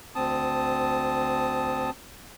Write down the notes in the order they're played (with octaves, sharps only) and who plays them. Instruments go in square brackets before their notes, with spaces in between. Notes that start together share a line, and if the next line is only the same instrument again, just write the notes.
[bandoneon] D2 C4 A5 D#6